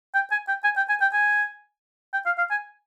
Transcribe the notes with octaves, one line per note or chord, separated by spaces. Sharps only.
G5
G#5
G5
G#5
G5
G#5
G5
G#5
G5
F5
F5
G#5